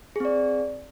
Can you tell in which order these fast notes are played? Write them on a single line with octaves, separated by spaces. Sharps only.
G#4 C4 D5